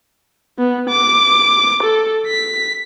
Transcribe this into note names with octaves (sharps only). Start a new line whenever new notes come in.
B3
D6
A4
B6